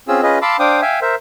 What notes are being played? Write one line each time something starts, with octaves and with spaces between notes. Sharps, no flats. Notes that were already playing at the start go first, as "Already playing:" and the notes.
C4 C#4 F4 G#4 E6
C#4 F4 G#4 B4 D#5
F5 A5 B5 C6 D6 E6
D4 C5 F5 G5 D6 D#6
E5 F5 G5 G#5
A#4 C5 E5